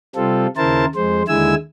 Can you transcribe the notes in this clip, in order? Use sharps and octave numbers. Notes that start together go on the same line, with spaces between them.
C3 G3 C4 F4 A4
D#2 C#3 E4 A#4 C5 A5
F2 G#3 C5
D#2 D3 G#3 E4 G#5 E6